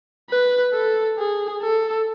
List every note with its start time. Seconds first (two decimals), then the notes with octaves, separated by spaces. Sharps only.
0.30 B4
0.73 A4
1.19 G#4
1.63 A4